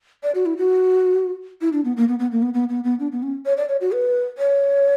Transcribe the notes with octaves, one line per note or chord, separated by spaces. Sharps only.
D5
F#4
E4
F#4
E4
D4
B3
A#3
B3
B3
A#3
B3
B3
B3
B3
D4
B3
C#4
C#5
D5
C#5
F#4
B4
C#5